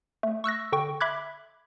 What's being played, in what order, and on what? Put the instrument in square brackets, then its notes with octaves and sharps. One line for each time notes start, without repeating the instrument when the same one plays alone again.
[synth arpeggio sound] A3
C#6 E6 F#6 A#6
D3 G5 C#6
E5 B5 D6 F#6 G#6